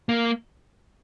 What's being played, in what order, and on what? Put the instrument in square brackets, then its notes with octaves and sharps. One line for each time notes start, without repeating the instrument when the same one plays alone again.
[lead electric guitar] A#3